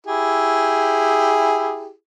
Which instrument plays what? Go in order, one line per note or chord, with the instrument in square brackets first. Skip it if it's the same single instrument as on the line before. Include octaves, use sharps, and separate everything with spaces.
[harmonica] E4 G4 G#4